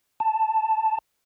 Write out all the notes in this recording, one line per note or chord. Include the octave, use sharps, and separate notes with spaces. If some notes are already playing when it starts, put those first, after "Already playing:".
A5